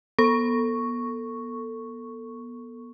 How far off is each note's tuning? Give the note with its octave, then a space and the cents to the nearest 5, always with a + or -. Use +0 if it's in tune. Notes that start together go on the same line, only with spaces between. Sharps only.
B3 -30 A4 +20 C#6 +0